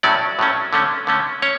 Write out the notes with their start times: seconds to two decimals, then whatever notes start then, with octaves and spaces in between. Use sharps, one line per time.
0.03 A2 F#3 A3 C#4 D5
0.39 A2 F#3 A3 C#4
0.73 D3 A3 C#4
1.07 D3 A3 C#4
1.42 C#4 C#5